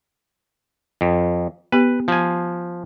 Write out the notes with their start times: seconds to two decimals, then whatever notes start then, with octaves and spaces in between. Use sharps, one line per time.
1.01 F2
1.72 B3 G4 B4
2.08 F3 G#5